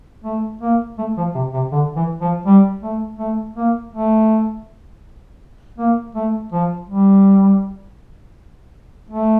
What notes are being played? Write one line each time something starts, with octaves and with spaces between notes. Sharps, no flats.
A3
A#3
A3
F3
C3
C3
D3
E3
F3
G3
A3
A3
A#3
A3
A#3
A3
F3
G3
A3